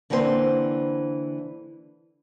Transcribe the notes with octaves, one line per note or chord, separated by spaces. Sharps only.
D3 E3 A#3 C4 G#4 C5